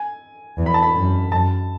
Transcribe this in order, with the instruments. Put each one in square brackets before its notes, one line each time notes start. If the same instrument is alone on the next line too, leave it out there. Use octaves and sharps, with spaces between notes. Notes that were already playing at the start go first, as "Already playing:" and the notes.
Already playing: [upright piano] G#5
[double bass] E2
[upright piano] B5
A5
B5
[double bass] F#2
[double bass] F#2 [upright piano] A5